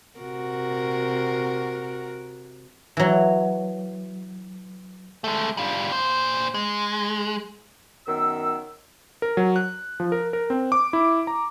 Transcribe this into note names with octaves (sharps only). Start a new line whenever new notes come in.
C3 F#4 A#4
E3 F#3
G#3 A3
G3 F4
A#2 C5
G#3
F#2 D#3 B3 E6
A#4
F#3
F#6
F3
A#4
A#4
C4
D6
E4
A#5